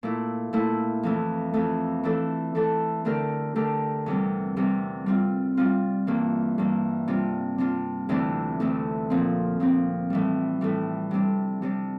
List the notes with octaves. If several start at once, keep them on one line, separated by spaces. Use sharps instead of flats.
A#2 A3 E4
A#2 A3 E4
F2 E3 A3
F2 E3 A3
E3 A3 D4 A4
E3 A3 D4 A4
D3 A3 D4 G4 A#4
D3 A3 D4 G4 A#4
E2 C3 G3
E2 C3 G3
G3 C4 F4
G3 C4 F4
G2 E3 A#3
G2 E3 A#3
C3 G3 D4 F4
C3 G3 D4 F4
D2 C3 E3 A3 D4
D2 C3 E3 A3 D4
A#2 F3 C4
A#2 F3 C4
A2 E3 G3
A2 E3 G3
C3 G3 D4
C3 G3 D4